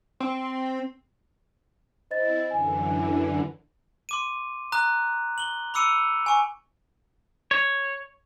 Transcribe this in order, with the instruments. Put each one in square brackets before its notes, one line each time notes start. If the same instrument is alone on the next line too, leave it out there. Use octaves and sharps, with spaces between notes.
[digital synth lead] C4
[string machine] C4 E4 [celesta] C5 D#5 A6
[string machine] F#2 D3 E3 [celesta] G#5
[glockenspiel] C6 D6 D#7
A#5 D#6 F#6
F#7 G7
B5 D6 E6 C#7 D#7 F7
G#5 C#6
[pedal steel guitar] C#5